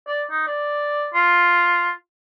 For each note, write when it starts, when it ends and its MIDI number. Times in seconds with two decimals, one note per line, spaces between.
0.07 0.23 74
0.31 0.43 63
0.47 1.08 74
1.14 1.91 65